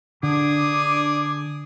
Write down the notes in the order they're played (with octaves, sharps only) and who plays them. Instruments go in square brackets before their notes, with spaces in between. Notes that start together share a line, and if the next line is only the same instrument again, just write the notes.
[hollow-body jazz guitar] D3 [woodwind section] D4 D6 [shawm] G#4